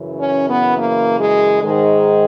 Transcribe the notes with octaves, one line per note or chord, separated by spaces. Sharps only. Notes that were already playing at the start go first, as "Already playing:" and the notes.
Already playing: F#2 C#3 E3
C#4
B3
A#3
G#3
G#2 D#3 G#3